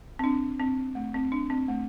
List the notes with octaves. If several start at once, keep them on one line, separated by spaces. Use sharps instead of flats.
C4
D4
C4
A3
C4
D4
C4
A3